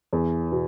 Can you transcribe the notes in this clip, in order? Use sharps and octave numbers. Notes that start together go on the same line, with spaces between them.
E2
B2